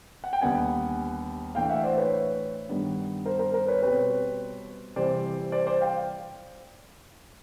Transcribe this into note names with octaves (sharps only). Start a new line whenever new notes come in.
F#5
G5
D#2 D3 G3 B3 D4 F#5 G#5
A2 E3 A3 D4 F5 G5
E5 F#5
C5 D5
B4 C#5
G2 D#3 G3 B3 D4
A#4 C5
A#4 C5
A#4 C5
B4 C#5
B2 G3 C4 B4 C#5
C3 E3 G3 C5 D5
C5 D5
C5 D5
F5 G5